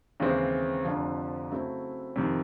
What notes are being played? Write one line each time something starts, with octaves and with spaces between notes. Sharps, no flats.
D#2 C#3 E3 G#3 C4
F1 F2 D3 F3
C#3 F#3 A3 C4 E4
F2 C3 D#3